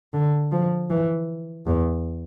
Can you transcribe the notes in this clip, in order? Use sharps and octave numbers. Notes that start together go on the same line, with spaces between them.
D3
F3
E3
E2